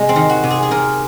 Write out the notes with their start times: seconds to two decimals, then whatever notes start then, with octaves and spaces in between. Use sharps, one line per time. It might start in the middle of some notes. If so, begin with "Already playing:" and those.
Already playing: C3 G#3
0.09 C4
0.16 D#3
0.29 F#4
0.43 C3
0.50 G#4
0.63 G#4
0.71 C3 A#4